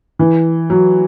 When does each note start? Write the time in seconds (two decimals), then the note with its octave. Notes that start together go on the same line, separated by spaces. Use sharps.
0.19 E3
0.70 F#3